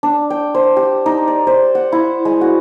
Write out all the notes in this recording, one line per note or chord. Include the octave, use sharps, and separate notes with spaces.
D4
G5
C5
G4
D#4
D5
C5
F#5
E4
G#3
F#4